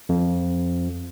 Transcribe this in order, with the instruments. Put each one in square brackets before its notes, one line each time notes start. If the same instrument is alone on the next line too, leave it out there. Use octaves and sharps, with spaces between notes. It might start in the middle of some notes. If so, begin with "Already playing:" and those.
[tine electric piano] F2